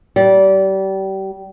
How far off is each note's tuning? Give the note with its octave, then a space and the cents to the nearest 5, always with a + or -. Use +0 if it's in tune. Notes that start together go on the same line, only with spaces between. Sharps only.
G3 -30